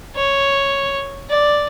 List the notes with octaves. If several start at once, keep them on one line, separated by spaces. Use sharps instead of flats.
C#5
D5